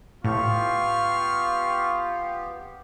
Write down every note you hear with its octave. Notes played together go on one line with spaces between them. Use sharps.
A2 B3 F4 G4 C#6 F6